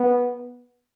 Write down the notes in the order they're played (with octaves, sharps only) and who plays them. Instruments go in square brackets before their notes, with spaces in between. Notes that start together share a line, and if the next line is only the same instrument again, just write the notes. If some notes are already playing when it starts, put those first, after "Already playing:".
Already playing: [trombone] B3